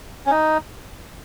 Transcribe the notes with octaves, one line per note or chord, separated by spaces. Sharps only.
C#4
D#4